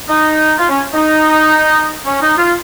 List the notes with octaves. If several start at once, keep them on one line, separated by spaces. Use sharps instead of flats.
D#4
F4
C#4
D#4
C#4
D#4
F4